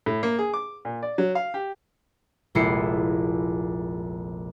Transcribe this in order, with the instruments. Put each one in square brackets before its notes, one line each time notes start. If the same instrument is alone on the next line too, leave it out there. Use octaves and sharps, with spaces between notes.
[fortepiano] A2
A#3
G#4
D6
A#2
D5
F#3
F5
G4
[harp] F1 A#1 G#3 E4 C7 C#7